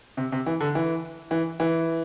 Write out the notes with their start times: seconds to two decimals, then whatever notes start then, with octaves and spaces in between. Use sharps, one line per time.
0.17 C3
0.32 C3
0.46 E3
0.60 D3
0.75 E3
1.31 E3
1.60 E3